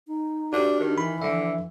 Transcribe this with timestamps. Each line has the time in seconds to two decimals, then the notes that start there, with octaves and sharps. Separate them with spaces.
0.08 D#4
0.53 D4 F#4 G4
0.80 D#3 D4
0.98 E3 B5
1.22 D3 F3 E5